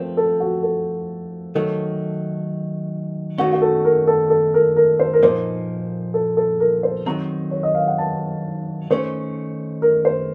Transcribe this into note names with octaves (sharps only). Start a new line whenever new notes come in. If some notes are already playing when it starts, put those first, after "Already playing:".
Already playing: F3 A3 C4 C5
A4
F#4
A4
D#3 F#3 A3 A4
D#3 A3 C#4 F#4
F#4
A4
A#4
A4
A4
A#4
A#4
C5
A#4
A#2 F3 A#3 D#4 C5
A4
A4
A#4
C5
D#3 F#3 C4 A#5
C#5
D#5
F5
F#5
A5
D#3 A3 C#4 C5
A#4
C5